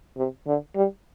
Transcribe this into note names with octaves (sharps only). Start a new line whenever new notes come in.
C3
D3
G3